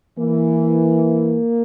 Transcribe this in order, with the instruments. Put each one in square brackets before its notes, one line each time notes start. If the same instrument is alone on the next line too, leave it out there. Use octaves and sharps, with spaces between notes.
[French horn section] E3 [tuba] A#3